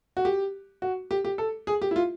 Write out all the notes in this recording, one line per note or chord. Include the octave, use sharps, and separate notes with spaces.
F#4
G4
F#4
G4
G4
A4
G#4
G4
E4
F4